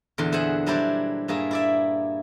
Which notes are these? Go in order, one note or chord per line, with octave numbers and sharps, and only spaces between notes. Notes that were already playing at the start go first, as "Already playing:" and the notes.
E2 A#2 D3 C6
G#4 C5 E5 F#5 G#5
F#3 G3 D4 E4 C5 D5
G2 A#3 G#4 E5
E4 D5 E5